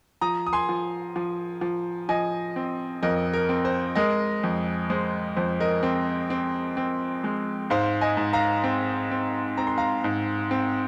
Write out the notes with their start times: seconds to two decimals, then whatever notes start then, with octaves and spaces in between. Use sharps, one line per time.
0.21 F3 A#5 D#6
0.46 D#6
0.53 G#5 C6
0.69 F3
1.16 F3
1.61 F3
2.09 F3 D#5 G#5
2.56 C4
3.03 F2 A#4 D#5
3.33 A#4
3.49 C4
3.65 C5
3.95 G#3 A#4 D#5
4.43 F2
4.90 G#3 C5
5.36 F2 C5
5.60 A#4 D#5
5.83 C4
6.30 C4
6.77 C4
7.24 G#3
7.70 G#2 C5 F5
8.01 D#5 G#5
8.17 G#2
8.33 F5 A#5
8.64 C4
9.11 C4
9.57 C4 A#5
9.67 C6
9.78 F5 A#5
10.04 G#2
10.51 C4